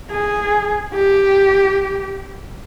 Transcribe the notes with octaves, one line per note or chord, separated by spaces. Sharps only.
G#4
G4